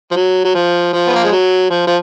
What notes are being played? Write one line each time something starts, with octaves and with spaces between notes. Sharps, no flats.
F3
F#3
F#3
F3
F3
B3
A#3
G#3
F#3
F3
F3